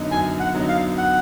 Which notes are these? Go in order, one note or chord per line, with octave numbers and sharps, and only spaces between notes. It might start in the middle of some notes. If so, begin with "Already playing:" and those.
Already playing: F#2 D3 F#3 B3 D#4
F#2 G#5
F#5
D3 F#3 B3 D#4
F5
F#5